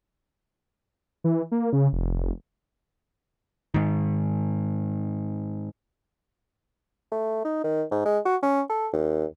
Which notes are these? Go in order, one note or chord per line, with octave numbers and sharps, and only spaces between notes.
E3
A#3
C#3
F1
G#2 D#3
A3
D#4
D#3
G#2
G#3
F#4
C#4
A4
D#2